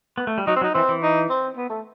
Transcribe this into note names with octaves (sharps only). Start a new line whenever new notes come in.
B3
A3
G3
F#3 D#4
C4
F#3 D#4
E3 C4
E3
D#4
C4
B3
A3